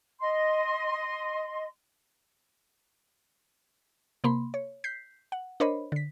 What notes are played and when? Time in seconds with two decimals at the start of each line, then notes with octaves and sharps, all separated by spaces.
0.20 D#5 C6
4.24 C3 A#3 B5 C6
4.54 C#5
4.84 G6 B6 C7
5.32 F#5
5.60 D4 A#4 C5 C#5 D#5 B5
5.92 D3 B6